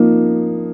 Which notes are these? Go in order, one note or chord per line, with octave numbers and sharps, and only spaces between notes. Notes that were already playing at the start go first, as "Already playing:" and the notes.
Already playing: F3 A#3 D#4